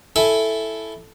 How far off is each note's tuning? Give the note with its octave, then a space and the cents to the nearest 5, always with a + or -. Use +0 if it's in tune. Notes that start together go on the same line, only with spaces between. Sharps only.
E4 +0 A4 +0 G#5 +0